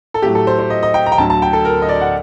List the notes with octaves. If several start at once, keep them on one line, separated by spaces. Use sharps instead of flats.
A4
A2 F#3 A3 G4
A4
C5
C5
D#5
D#5
G5
A#5
G5
D2 D3 F#3 A5
A5
G5
A4
A#4
D#5
D5
F#5